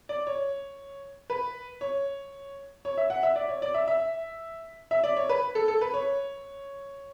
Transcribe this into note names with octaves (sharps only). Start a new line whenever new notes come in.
D5
C#5
B4
C#5
C#5
E5
F#5
E5
D5
C#5
D5
E5
E5
E5
D5
C#5
B4
A4
A4
B4
C#5